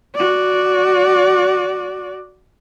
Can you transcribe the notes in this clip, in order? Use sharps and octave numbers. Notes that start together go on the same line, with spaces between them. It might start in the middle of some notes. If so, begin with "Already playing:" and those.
F#4 D5